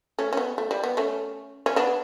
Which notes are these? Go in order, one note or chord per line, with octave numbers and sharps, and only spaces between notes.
A3 C#4
C#4
B3
A3
G3
B3
A3 C#4
C#4
B3 D4